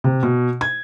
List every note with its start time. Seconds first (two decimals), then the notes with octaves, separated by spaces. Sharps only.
0.04 C3
0.23 B2
0.61 G#6